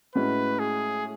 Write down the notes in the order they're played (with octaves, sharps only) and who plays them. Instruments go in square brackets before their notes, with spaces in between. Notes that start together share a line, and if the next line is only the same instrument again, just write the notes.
[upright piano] A2 G#3 C#4 F#4 [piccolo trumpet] B4
[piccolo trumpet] G#4